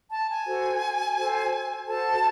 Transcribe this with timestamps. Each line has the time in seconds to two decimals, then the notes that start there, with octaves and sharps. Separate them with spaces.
0.11 A5
0.29 G#5
0.46 F#4 A4 C5
1.16 F#4 A4 C5
1.88 F#4 A4 C5 A5